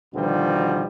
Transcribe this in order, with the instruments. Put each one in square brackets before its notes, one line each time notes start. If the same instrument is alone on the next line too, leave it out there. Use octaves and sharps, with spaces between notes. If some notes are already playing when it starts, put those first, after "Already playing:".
[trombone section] D2 B2 D#3 F3 G3 B3